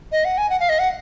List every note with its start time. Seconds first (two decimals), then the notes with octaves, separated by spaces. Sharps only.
0.12 D#5
0.25 F#5
0.38 G#5
0.50 F#5
0.60 F5
0.69 D#5
0.79 F#5